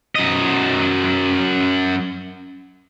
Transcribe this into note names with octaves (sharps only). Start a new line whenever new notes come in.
F#2 D#5